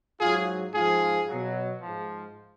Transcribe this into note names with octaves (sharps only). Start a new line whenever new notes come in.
G#2 F#3 F4 G#4
G#2 F3 F4 G#4
B2 F#3
G#2 F3